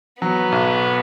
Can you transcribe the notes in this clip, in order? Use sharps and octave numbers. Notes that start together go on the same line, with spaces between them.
F#3 B3
B1